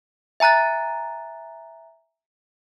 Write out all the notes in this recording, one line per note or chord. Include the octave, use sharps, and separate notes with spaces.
E5 G#5 A#5 F#6 A6